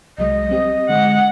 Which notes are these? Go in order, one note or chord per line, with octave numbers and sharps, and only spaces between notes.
C2 F#3 G#3 D#5
G3 C4 G4
D3 G#3 F#5